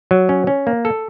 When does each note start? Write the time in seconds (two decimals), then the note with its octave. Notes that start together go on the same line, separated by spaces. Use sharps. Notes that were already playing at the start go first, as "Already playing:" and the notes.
0.11 F#3
0.29 C#4
0.47 C#4
0.67 A#3
0.85 A4